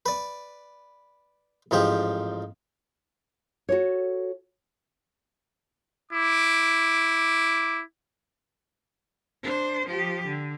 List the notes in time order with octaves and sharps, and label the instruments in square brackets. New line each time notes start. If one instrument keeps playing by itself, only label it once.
[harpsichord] B4 D5
A1 G#2 F3 G4 G5
[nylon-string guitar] F#4 A4 C#5
[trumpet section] E4 D6
[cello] D4 C5
F3 G4
D3